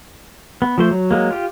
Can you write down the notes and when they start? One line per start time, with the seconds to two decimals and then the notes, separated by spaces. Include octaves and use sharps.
0.62 B3
0.78 F3 A3 C5
0.91 F#3
1.11 F#3 G#3 A#3
1.31 F4 G4